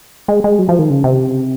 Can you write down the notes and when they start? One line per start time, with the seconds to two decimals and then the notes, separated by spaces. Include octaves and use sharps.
0.28 G#3
0.44 G#3
0.59 F#3
0.69 F3
0.79 D#3
0.90 C#3
1.04 C3